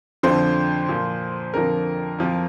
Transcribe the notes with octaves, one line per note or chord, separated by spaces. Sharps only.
F2 D3 F3 C5
A#2 F3
F2 D3 F3 A#4
F2 F3